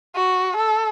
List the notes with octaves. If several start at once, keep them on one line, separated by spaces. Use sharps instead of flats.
F#4
A4